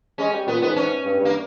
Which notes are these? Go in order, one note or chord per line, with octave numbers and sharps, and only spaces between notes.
G#3 C#4
G3
A#2 B3
G#2 B3
C#4
G2
G2
A#3